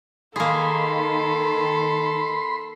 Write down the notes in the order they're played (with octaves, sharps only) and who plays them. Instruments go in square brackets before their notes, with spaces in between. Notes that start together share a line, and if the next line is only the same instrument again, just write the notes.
[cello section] D#3 [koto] A#3 G#4 [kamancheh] A4 [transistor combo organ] B5 C6